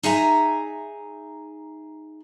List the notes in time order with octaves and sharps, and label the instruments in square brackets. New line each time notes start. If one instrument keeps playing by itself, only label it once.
[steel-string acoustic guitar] D#4 G#4 E5 G#5 A#5